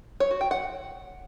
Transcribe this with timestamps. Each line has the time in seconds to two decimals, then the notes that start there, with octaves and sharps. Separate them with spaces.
0.20 C#5
0.31 F#4
0.41 G5
0.51 F#5